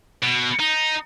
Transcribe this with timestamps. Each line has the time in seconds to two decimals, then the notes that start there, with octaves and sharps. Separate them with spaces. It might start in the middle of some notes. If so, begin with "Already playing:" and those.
0.23 B2
0.60 D#4